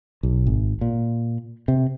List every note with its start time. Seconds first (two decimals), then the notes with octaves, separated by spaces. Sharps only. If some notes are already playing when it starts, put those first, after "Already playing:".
0.23 B1
0.47 G#1
0.81 A#2
1.68 C3